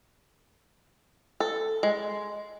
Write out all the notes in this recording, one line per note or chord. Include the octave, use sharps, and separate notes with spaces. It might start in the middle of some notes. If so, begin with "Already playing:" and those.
A4
G#3